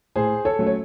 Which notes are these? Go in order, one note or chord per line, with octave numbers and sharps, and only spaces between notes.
A2 G#4 C5
A4 C#5
F#3 A3 C#4
C#5